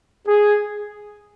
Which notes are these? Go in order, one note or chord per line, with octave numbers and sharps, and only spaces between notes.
G#4